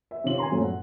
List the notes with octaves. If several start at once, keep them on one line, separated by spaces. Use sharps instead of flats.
E5
C3 D#3 C#4 F4 F#7
G#5 A#5 C6
F#2 A#2 F#3 A3 C4 C#4
F#5